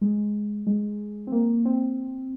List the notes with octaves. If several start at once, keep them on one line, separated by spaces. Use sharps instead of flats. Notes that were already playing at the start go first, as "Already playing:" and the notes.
G#3
G#3
C4
A#3
C4